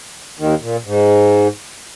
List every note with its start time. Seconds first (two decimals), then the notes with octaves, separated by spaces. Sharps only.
0.39 D#2 D#3
0.61 A#2
0.85 G#2